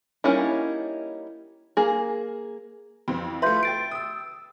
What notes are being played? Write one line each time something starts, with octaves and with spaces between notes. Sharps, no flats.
G3 A#3 C#4 D#4 E4
A#3 G#4
F2 E3 C4
A3 F4 B4 E5 C6 G6
G5 A6 C7 D7
D#6 E6